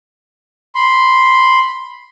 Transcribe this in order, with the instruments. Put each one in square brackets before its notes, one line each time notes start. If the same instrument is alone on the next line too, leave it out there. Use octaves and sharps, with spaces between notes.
[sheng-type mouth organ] B5 C6